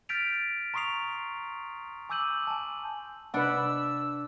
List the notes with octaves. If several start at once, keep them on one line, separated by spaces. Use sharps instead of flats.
F6 G6 A6 B6 D7 F7
A#5 C6 C#6 D#6 C7 F7
G#5 D6 E6 G6 D#7 F#7
G#5 A5
C3 D4 B4 D#5 F#5 B5 E6